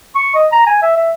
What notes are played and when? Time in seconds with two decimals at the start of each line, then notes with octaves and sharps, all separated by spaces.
0.15 C#6
0.35 D#5
0.52 A#5
0.66 G#5
0.82 E5
0.96 E5